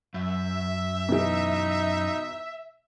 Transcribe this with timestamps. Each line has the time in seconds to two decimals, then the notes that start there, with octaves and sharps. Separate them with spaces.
0.14 F#2 E5
1.09 B2 E3 D#4